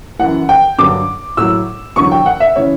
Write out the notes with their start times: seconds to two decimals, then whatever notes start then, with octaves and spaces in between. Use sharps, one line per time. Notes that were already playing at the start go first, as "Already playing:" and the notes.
0.19 F#2 E3 F#5
0.49 G5
0.78 G2 D3 F#3 D6
1.37 A2 F#3 E6
1.96 E2 D3 F#3 C#6
2.12 G5
2.26 F#5
2.40 E5
2.56 C#3 E3 C#5